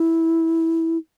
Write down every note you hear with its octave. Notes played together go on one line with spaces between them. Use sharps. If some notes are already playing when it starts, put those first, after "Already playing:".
Already playing: E4